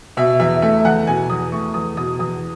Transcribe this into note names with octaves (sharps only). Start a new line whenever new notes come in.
B2 E5
E2 E5
A3 E5
E2 F#5
B2 G#5
E2 D#6
A3 C#6
E2 D#6
B2 D#6
E2 D#6